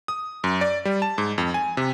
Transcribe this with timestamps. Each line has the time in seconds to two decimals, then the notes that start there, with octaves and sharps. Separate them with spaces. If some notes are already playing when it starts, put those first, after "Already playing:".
0.08 D#6
0.44 F#2
0.61 D5
0.85 G3
1.02 A5
1.18 G#2
1.38 F2
1.54 G#5
1.77 C3